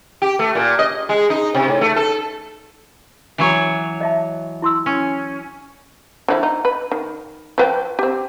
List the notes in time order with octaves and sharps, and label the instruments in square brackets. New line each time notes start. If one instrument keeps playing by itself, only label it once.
[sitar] G4
A3
A#2
D#5
G#3
D#4
C3
A2
A3
A4
[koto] E3 F#3 C#5
[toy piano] D#5 E5 A5
E4 C6 E6
[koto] C#4
[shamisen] D3 F3 E4
D#4
B4
D#3
F3 B4 G5
C4 G4